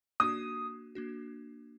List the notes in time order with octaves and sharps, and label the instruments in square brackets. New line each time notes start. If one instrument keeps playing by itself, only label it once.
[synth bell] A#3 D4 F#4 [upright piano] D#6
[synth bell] A#3 D4 F#4